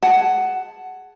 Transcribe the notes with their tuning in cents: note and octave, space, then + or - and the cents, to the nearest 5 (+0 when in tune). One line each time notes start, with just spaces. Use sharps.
G#4 +0 F#5 +10 A5 +0